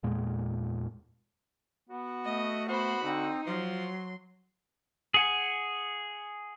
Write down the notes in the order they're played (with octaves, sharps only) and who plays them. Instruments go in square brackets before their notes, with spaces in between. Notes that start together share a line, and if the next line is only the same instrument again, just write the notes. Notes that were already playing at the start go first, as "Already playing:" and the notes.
[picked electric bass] E2 A#2 G#3
[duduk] B3 [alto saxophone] F#4
[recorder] A3 [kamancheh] D#5
[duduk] B3 [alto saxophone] F#4 [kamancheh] C5 B5
[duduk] D3 [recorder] C4 [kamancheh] D#4
[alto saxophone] F3 [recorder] F#3 [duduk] F4 [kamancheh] C6
[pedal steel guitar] G#4 F#5 G#5